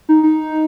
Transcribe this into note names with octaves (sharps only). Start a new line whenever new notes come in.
D#4
D#4